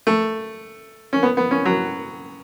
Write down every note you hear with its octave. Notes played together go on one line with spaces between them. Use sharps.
A3
C#4
B3
B3
C#4
F#3